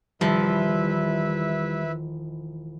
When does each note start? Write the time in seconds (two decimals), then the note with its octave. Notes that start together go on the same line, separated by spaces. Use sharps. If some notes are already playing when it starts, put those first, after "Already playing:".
0.21 E1 D#3 F3 G3 E4 B4 E5 B5